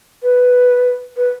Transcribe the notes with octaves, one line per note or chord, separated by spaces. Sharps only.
B4
B4